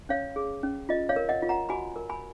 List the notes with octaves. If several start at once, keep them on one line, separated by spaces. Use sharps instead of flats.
C#4 C#5 F5
G#4
C#4
F4 D#5
C#5 F5
A#4
D#5 F#5
F4
F#5 A#5
F#4 G#5 B5
A#4
G#5 B5